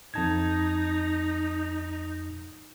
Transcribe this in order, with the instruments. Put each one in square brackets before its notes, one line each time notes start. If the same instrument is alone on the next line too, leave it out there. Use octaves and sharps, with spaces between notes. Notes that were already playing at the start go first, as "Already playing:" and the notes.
[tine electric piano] F2 A5 G#6 [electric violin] D#4